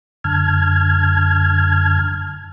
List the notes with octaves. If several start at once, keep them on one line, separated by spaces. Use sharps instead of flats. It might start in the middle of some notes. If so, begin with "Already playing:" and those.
F#2 D3 A5 F6 G#6